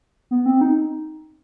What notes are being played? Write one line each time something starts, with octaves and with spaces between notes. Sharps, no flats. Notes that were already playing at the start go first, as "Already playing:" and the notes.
B3
C4
D#4